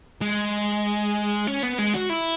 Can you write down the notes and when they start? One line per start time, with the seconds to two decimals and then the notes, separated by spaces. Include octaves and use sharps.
0.21 G#3
1.47 C#4
1.63 B3
1.78 G#3
1.94 F#4
2.09 E4